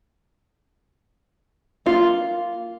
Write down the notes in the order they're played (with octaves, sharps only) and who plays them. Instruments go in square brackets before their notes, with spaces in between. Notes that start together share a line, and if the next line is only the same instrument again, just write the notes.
[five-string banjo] A#3 F4